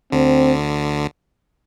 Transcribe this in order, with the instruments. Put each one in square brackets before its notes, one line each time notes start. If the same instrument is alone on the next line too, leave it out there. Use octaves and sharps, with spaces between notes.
[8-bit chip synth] D2 D3 [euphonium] C4